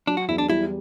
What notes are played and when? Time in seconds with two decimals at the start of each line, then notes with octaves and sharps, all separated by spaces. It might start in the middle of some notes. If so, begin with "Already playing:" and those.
0.07 F#3 D4
0.17 F#4
0.28 E2 E4
0.38 D4
0.49 G3 E4